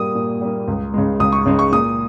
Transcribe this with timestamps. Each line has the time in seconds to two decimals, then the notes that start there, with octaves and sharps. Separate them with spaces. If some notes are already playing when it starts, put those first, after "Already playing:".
Already playing: A#2 G3 A#3 D#6
0.15 A#2
0.41 G3 A#3
0.68 C#2
0.94 C#3 G#3
1.20 C#2 D#6
1.32 C#6
1.45 C#3 G#3
1.59 C#6
1.72 A#2 D#6